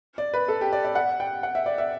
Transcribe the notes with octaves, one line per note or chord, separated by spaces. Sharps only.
D5
B4
A4
G4
D5
D5
F#5
G5
F#5
E5
D5
E5